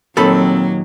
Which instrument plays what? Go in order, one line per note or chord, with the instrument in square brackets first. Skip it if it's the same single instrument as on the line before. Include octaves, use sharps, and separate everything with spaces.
[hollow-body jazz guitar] D#2 A#2 D#3 [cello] F#3 [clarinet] C4 [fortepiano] A4 B5